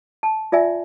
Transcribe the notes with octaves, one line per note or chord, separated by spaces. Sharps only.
A5
F4 D5 E5 G#5